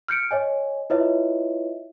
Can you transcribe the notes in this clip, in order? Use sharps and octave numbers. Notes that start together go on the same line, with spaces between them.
F6 G6 C#7 D7
C#5 D#5 G#5
E4 F4 B4 C#5 D#5 E5